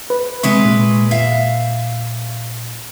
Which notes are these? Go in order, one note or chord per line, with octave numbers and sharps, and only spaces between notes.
B4
C3 G#3 B4 E5 C#6
A#2
E5 F5